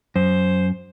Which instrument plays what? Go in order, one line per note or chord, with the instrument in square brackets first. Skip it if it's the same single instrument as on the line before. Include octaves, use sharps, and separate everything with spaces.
[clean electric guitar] F#2 [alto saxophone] C5